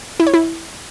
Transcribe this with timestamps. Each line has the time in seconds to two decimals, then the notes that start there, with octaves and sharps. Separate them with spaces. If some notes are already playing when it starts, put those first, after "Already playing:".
0.20 E4
0.27 C#5
0.34 E4